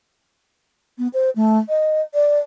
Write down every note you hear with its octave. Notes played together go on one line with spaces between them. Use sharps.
B3
C5
A3
D#5
D5